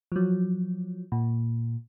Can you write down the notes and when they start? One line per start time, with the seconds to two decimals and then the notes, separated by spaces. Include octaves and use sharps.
0.12 F3 F#3
1.12 A#2